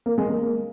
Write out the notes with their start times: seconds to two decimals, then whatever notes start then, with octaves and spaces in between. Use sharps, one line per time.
0.06 A#3
0.18 G#3
0.29 A#3